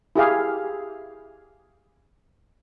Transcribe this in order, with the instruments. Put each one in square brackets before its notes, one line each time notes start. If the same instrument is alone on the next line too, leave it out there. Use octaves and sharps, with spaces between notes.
[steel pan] E4 G4 G#4 F5